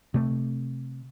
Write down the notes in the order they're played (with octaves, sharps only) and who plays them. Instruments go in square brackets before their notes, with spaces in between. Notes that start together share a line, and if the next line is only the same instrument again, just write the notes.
[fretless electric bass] C3 A3